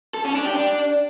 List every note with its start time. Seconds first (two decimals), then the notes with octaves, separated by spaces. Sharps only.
0.14 A4
0.25 C#4
0.35 D4
0.45 G4
0.56 D4